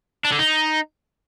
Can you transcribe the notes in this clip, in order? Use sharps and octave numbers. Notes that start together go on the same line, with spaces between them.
D4
D3
D#4